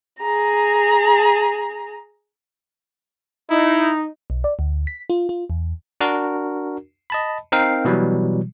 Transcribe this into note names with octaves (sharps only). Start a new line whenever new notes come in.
G#4 A#5
D#4 E4
B1
D5
D2
B6
F4
F4
E2
D4 F#4 A#4
D#5 A5 B5
C4 D#4 A#4 F5 G5 C7
B2 E3 F#3 G3